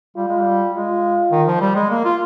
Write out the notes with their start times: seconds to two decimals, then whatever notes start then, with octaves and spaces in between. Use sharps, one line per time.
0.16 G3 F4
0.28 G#3
0.40 G3
0.74 G#3 F4
1.32 D#3
1.47 F3
1.61 G3
1.75 G#3
1.90 A#3
2.05 F4